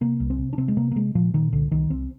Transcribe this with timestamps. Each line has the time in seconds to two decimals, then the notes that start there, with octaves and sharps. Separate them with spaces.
0.01 C3 A#3
0.20 C2
0.30 C4
0.39 C3
0.53 D4
0.57 C3 C4
0.68 G#3
0.77 C3 A#3
0.91 A#3
0.95 C3 G#3
1.15 A#2 F3
1.34 A#2 D#3
1.52 C2 D3
1.71 C2 D#3
1.90 C2 C4